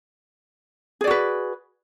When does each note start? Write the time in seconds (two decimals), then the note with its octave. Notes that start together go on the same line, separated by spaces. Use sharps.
1.01 G#4
1.04 D5
1.07 F#4
1.11 B4